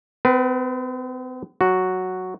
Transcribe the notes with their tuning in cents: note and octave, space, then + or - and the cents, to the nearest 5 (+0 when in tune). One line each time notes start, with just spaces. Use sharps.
C4 -45 B4 -10
F#3 +0 F#4 +0